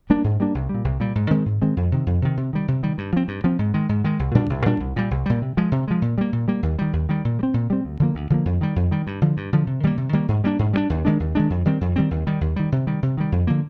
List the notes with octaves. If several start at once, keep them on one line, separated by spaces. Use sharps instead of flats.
G3 A#3 D4
G#2
G3 A#3 D4
C2
G3
A#2
C2
A#2 G3
G#2
D#3 G#3 C4
G#2
D#3 G#3 C4
F2
C3 D#3
F2
C3 D#3
C3
D#3 G3
C3
D#3 G3
G2
F3 C4
G2
F3 C4
G#2
D#3 G#3
G#2
D#3 G#3
C2
A#2 G3 D4
C2
A#2 G3 D4
C2
A#2 G3
C2
A#2 G3
C3
F3 G#3
C3
F3 G#3
A#2
G3 A#3
A#2
G3 A#3
D#2
D#3 G3
D#2
D#3 G3
A#2
G3
C4
A#2
G3 C4
D2
D3 F3 A#3
D2
D3 F3 A#3
F2
D#3 G3
F2
D#3 G3
G2
D3 F3
G2
D3 F3
C3
D#3 G3 A#3
C3
D#3 G3 A#3
G#2
G3 A#3 D4
G#2
G3 A#3 D4
D#2
D#3 G#3 D4
D#2
D#3 G#3 D4
F2
D#3 G3 C4
F2
D#3 G3 C4
D#2
D#3 G3
D#2
D#3 G3
C3
D#3 G3
C3
D#3 G3
F2
D3 F3 A#3